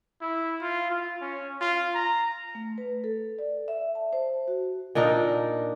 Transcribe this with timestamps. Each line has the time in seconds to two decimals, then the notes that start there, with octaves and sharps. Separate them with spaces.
0.22 E4
0.61 F4
0.91 F4
1.21 C#4
1.61 F4
1.95 A#5
2.55 A3
2.78 B4
3.04 A4
3.39 D5
3.68 E5
3.95 A5
4.13 C5
4.48 F#4
4.95 A#2 D4 D#4 A#4